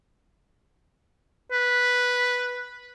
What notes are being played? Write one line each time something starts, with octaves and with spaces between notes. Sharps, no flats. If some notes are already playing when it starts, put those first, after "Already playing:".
B4